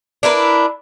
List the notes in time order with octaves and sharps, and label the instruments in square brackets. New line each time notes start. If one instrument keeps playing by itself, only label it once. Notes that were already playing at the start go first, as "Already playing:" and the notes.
[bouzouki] D4 E4 A#4 B4